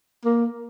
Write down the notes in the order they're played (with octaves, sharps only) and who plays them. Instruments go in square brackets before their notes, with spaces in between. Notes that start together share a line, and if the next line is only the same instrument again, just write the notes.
[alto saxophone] A#3